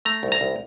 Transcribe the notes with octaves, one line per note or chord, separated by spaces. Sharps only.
A3 A#5
C2
A#5
C2